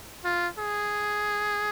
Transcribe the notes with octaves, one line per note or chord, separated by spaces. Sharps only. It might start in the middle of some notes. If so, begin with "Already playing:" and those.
F4
G#4